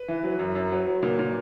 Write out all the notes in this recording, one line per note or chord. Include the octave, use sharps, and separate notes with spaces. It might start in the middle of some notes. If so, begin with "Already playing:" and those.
Already playing: B4
E3
F#3
F#2
F#2
F#3
F#3
A#2
A#2